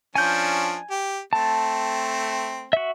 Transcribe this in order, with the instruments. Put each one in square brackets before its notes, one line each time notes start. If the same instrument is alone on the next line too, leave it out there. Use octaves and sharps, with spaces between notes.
[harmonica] F3 C#4 D4 [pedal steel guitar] G#5 G6
[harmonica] G4
[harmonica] A3 C4 [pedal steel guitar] A5
[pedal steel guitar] F#4 E5